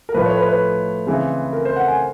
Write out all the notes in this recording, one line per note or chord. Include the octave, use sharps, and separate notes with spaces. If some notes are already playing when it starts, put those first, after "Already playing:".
A#4
A2 F3 A3 B4
C#5
B4
B4
C#3 E3 G#3 C4
A#4
C5
F#5
G#5